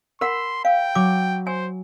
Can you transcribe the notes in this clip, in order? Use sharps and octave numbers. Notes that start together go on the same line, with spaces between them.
A#4 F#5 B5 C6 E6
F5 G5
F#3 D6
C5 G#5